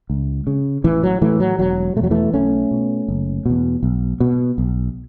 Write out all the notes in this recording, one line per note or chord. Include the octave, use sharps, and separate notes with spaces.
C#2
C#3
A1 E3
F#3
A2 E3 A3
F#3
E1 F#3
B2 A3
E2 F#3
E3 A3
B1 A3 C#4
B2
F#1
E2 B2
B1
B2
B1